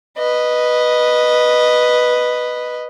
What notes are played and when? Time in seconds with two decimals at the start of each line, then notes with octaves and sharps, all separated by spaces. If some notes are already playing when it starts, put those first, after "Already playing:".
0.18 B4 D#5